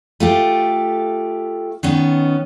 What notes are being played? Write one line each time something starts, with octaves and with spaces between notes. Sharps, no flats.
A3 F4 G4
D#3 B3 C#4